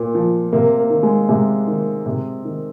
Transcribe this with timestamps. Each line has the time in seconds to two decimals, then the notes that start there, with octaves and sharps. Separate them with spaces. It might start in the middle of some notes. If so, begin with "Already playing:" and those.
Already playing: A#2
0.15 F3
0.52 C3 A#3
0.78 A#3
0.90 D#3
1.03 G#3
1.29 C3 G#3
1.67 D#3
2.06 C3
2.45 D#3